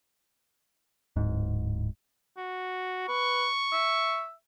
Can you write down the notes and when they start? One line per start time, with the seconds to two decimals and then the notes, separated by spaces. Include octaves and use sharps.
1.16 D1 G#2
2.37 F#4
3.08 B4 C#6
3.72 E5